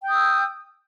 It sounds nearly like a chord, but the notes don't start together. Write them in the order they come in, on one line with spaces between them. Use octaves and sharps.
G5 G6 D#6 E6